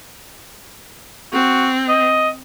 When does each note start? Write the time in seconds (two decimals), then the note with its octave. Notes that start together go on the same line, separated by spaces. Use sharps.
1.33 C4 F#4
1.89 D#5